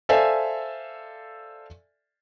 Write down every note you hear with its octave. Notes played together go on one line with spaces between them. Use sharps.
A4 C5 D5 E5 F5 G#5